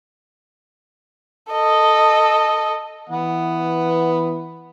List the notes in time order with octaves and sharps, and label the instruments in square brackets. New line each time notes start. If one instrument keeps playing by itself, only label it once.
[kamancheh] A4 D#5
[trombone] E3 [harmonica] B3 F#5